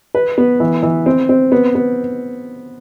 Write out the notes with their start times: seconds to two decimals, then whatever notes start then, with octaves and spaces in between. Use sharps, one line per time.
0.15 B4
0.38 B3
0.60 E3
0.83 E3
1.06 C4
1.29 C4
1.52 B3
1.75 B3